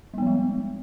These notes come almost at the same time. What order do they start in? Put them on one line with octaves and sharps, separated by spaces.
G3 B3 F3 G#3